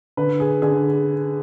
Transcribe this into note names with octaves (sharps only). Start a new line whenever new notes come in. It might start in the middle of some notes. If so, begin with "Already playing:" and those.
D3 B4
G#4
D3 G#4